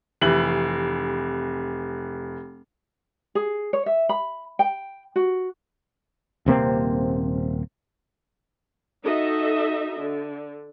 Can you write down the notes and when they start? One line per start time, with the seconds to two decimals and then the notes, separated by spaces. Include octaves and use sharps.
0.21 F1 E3 F#7
3.35 G#4
3.73 C#5
3.86 E5
4.09 B5
4.59 G5
5.16 F#4
6.46 D#1 C3 A#3 C4
9.05 D#4 F#4 A4 D#5 E5
10.00 D3